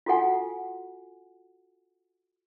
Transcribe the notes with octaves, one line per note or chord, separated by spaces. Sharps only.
F4 F#4 A4 F#5 G#5